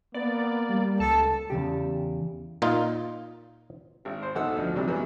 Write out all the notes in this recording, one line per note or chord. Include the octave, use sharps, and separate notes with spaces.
A#3 B3 D5
G3
C#2 A4 A5
E2 G#2 C#3 G4
A#2 D#4 F4
G#1
C5
B1 D#4 A4 F#5 E6
D2 F3
G#2 C3 F#3 G3
F#2 E3 F#3 G#3 B3